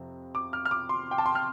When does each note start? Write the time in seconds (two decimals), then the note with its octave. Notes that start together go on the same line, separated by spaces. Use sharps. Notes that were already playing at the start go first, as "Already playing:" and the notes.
Already playing: F2 C3 F3 C4
0.35 D6
0.53 F6
0.65 F6
0.71 D6
0.89 C6
1.11 G5
1.18 A5
1.26 C6
1.35 F6